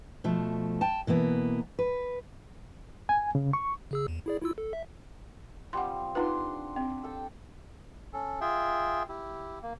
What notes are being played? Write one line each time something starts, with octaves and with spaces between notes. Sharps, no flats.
B2 F3 A3
G5 A5
B2 E3 A#3 B3
B4
G#5
C#3
C#6
C#3 G#4 E6
E2
E4 G#4 D5
E4 F4 E6
A4
E5
F3 G3 C4 F#5 C6
D4 D#4 F4 B4 F#5 C6
C4
A4 G5 A5
C#4 A4
F4 G#4 E5 G5
E4 G4
A#3